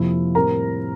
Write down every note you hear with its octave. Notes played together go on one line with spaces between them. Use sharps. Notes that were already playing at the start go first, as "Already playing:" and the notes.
Already playing: F2 C3 F3 A#3 E4
A2 G3 C4 E4 A#4 A#5